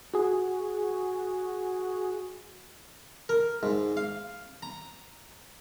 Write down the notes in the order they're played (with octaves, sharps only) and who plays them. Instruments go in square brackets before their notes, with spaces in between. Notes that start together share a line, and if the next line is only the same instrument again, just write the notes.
[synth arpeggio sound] F#4 G#4
[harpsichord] A#4
G#2
F5
A#5